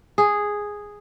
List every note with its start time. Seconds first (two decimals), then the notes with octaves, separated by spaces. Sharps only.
0.18 G#4